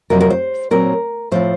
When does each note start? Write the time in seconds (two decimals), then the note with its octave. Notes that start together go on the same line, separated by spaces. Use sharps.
0.10 F2 C3 F#3 C4 A#4
0.21 A#4
0.30 C5
0.71 A#2 F#3 C4 A#4
1.31 A2 F3 C4 C5